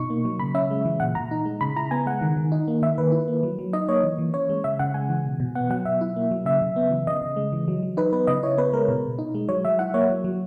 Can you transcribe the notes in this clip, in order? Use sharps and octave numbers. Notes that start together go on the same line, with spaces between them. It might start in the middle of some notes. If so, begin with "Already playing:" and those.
Already playing: B2 D#4 C#6
A#3
F#3
C#3 B5
C#4 E5
G#3
E3
A#2 F#5
A#2 A#5
D#4
G#3
C#3 B5
E4 A#5
B3 G#5
G#3 F#5
D#3
D#3
D#4
A#3
D#3 E5
D#3 B4
E4
A#3
F#3
F#3
D#4 D#5
A#3 C#5
E3
E3
C#4 C#5
G#3
C#3 E5
C#3 F#5
G#3 G#5
E3
B2
B2
B3 F#5
F#3 F#5
B2 E5
E4
A#3
F#3
C#3 E5
C#3
B3
E3
C#3 D#5
C#3
G#3
E3
F#3
F#3
D#4 B4
B3 B4
C#3 D#5
E4 C#5
B3 B4
G#3 A#4
B2
B2
D#4
G#3
F#3 C#5
F#3 E5
E4 F#5
A#3 C#5
F#3
F#3